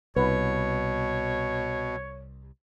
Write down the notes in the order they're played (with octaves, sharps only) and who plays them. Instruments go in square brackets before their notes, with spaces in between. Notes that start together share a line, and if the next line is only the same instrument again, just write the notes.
[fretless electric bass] C2 [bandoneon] B2 [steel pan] B4 [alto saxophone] C#5